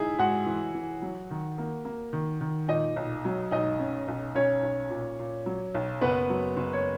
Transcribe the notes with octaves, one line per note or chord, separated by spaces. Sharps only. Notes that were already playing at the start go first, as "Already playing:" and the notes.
Already playing: D#4 E4 G#4
G#2 F#4 F#5
E3
E3
F#3
D#3
A#3
A#3
D#3
D#3
A#2 D#4 D#5
B1
F#3
B1 D#4 D#5
C#4
B1
B1 C#4 C#5
B1
A#2
A#2
F#3
B1
F#1 B3 B4
F#3
F#1
C#5